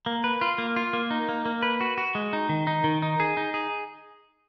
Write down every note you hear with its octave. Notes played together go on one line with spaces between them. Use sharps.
A#3
B4
F4
A#3
F4
A#3
D#4
A#3
A#3
B4
F#4
F#4
G#3
D#4
D#3
D#4
D#3
D#4
G#4
D#4
G#4